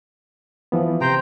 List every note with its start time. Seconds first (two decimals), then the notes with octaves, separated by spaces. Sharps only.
0.72 E3 F3 B3
1.01 C3 C5 G5 A#5 G6